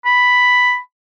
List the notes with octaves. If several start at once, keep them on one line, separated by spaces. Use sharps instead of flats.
B5